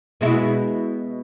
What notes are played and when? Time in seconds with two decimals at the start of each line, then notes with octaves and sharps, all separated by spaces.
0.21 B2 G#3 E4